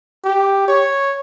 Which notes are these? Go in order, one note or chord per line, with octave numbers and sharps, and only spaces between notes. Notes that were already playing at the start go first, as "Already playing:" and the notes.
G4
C#5